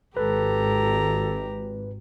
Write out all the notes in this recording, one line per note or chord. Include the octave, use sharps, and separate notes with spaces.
G#1 G4 A4 B4 A#5